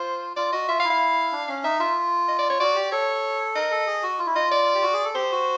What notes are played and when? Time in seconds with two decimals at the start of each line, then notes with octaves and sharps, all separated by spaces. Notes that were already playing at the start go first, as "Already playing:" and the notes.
Already playing: F4 C5
0.36 F4 D5
0.52 F#4 D#5
0.68 F4 E5
0.79 F5
0.84 E4
0.90 F5
1.32 D4
1.48 C#4
1.64 D#4 E5
1.79 F4 E5
2.28 D#5
2.39 D5
2.50 C#5
2.59 F#4 D5
2.75 G4
2.92 A4 C#5
3.55 A#4 D#5
3.71 A4
3.87 G#4
4.03 F#4
4.19 F4
4.27 E4
4.34 F4 D#5
4.51 D5
4.75 G4
4.83 F#4
4.94 G#4
5.05 A4
5.15 G4 C5
5.32 F#4